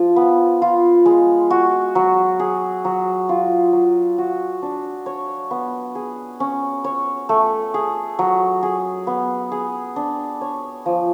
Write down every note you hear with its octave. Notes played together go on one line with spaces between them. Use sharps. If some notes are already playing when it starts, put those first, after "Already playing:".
Already playing: F3 F4
B3
F4
G#3
F#4
F#3
G#4
F#3
F4
F#3
F#4
D4
C#5
B3
G#4
C#4
C#5
A3
G#4
F#3
G#4
B3
G#4
D4
C#5
F3